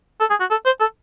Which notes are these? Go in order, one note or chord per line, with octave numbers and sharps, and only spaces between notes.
A4
G#4
F#4
A4
C5
A4